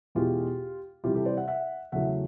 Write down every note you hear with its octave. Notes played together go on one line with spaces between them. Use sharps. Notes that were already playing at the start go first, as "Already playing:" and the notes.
E2 B2 G#3 F4 G4
C3 E3 G3 F4 G4
G4 A4
C5 D5
E5 F#5
E5 F#5
E2 C#3 F#3 A3 E5 F#5